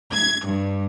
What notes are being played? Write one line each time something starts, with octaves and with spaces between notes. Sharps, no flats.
G#6
G2